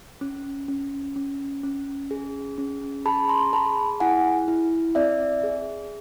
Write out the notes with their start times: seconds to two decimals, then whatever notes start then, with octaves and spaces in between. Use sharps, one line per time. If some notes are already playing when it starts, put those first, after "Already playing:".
0.21 C#4
0.68 C#4
1.16 C#4
1.63 C#4
2.11 G#4
2.58 C#4
3.05 G#4 A5 B5
3.29 A#5 C6
3.53 G#4 A5 B5
4.00 E4 F#5 G#5
4.48 E4
4.95 C4 D5 E5
5.43 G#4